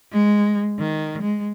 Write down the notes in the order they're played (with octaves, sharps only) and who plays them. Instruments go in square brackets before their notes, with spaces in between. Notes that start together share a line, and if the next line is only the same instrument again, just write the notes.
[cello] G#3
D#3
G#3